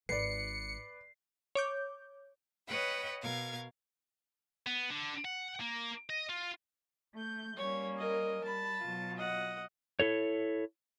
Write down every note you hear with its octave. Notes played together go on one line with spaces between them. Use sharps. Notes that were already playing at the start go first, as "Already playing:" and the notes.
G#1 B4 D5 C7 C#7
C#5 D6 G6
B4 C#5 D#5 F#5 G5 B5
B2 A#4 F5 G#6
B3
D3
F#5
A#3
D#5
F4
A3 G6
G3 A#3 C#4 C#5
A#4 D#5
G3 A5 B5
B2 F#3 F4
D#5 F#5
E4 A4 C#5